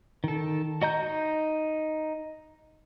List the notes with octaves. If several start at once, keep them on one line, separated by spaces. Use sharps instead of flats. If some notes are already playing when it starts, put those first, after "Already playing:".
D#3 A4
F#4 D#5 A#5 G6
D#4